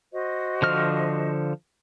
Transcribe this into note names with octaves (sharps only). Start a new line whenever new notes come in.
F#4 C5 D#5
D3 F3 F6